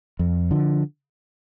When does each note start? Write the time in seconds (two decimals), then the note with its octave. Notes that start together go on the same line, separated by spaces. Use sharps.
0.19 F2
0.51 D3 F3